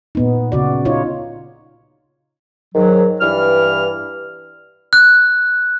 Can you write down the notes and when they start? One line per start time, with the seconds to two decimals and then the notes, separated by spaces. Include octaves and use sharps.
0.15 A#2 B3 D#4
0.52 C#3 F#4 D5
0.85 D#4 F4 C#5
2.74 G#2 D#3 F#3
3.21 G2 E3 F6
4.93 F#6